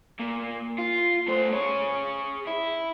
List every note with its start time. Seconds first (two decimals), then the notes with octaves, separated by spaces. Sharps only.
0.20 A#2
0.78 F4
1.28 A3 C5
1.53 G#4 C#5
2.47 E4